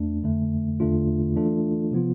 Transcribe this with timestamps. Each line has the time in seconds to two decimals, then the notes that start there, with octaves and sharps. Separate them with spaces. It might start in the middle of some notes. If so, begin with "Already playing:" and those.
Already playing: E2 A3 D4
0.23 F2 D3 A3
0.80 E2 D3 A3 D4 F4
1.35 E3 A3 D4 F4 A4
1.91 C3 F3 B3 F4